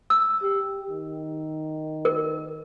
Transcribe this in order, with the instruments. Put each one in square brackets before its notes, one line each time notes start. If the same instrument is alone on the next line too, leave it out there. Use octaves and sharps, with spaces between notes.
[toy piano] E6
[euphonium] G4
D#3
[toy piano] A#4